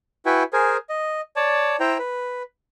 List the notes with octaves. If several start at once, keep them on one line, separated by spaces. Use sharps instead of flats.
E4 F#4 B4 G5 G#5
G#4 A#4 C5 G#5
D#5
C#5 D5 A5
E4 C5 G5 A#5
B4